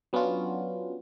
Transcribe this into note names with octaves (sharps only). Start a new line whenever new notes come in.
F#3 B3 C#4 D4 F4 F#4